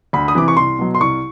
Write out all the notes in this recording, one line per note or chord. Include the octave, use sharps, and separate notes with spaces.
D2 B5
D#6
C3 E3 D6
C#6
C2 C6
B2 F#3
C6
C2 C#6